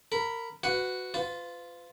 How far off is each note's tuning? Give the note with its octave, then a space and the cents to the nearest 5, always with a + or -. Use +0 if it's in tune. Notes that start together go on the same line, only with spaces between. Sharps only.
A#4 -20 B5 +0
F#4 +0 B4 +20 F#5 +0
F4 +0 B4 +40